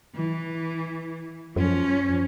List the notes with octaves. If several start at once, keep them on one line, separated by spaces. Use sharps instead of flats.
E3
F#2 F3 C#4